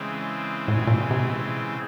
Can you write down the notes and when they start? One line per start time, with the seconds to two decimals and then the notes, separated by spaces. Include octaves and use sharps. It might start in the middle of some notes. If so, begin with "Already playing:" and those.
Already playing: C#3 E3 G#3 C4
0.68 A2
0.76 A#2
0.87 A#2
0.93 B2
1.11 C3